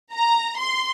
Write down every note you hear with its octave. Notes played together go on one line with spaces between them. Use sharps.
A#5
C6